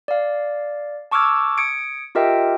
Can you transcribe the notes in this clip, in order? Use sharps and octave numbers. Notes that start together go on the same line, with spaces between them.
D5 F5
A5 C#6 D6 E6 F6 G#6
D#6 G#6 C#7 D7
F4 G4 A#4 D#5 E5 G5